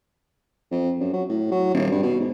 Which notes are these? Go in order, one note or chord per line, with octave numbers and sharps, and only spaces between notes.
F2
F#2
F#3
A2
F#3
D#1
G2
B2
G#2